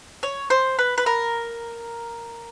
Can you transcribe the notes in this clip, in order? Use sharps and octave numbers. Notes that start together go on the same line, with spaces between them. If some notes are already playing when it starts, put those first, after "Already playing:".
C#5
C5
B4
B4
A#4